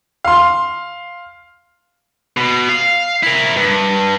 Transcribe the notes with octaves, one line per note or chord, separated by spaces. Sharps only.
F5 C6
B2
F5
E4 A#4
G2